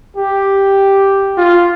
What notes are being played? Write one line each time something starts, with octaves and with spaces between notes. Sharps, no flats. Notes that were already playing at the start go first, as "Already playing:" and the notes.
G4
F4